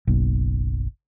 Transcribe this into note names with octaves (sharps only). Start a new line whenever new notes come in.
F#1 B1